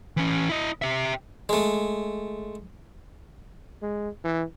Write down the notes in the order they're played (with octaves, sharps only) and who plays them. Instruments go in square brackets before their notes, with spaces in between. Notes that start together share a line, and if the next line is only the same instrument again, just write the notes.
[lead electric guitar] E3 C#4
E4 D#5
G4 E5
[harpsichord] G#3 A3
[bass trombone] G#3
E3